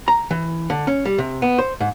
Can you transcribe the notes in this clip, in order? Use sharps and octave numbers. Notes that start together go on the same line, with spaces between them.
A#5
E3
D3
C#4
G3
C3
B3
C5
G#2